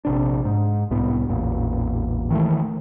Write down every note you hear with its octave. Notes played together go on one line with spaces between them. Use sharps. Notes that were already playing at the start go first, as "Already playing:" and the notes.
A#1 C3 D4
G#2
C2 A2 B3
A1 E2 A#2
D#3 E3 A3